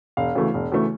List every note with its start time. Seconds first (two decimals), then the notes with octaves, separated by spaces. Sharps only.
0.17 E1 F5
0.35 D2 C#3 E3 A3
0.54 E1
0.72 D2 C#3 E3 A3